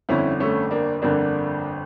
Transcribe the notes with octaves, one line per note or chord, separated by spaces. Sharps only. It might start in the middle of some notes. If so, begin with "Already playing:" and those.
G1 F2 D3 C#4 E4
A3 C#4
A#3 D4
G1 F2 D3 A#3 D4